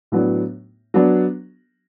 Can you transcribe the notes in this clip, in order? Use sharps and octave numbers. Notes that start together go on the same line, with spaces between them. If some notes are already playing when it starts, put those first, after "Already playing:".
A2 F#3 B3 D4
F#3 B3 D4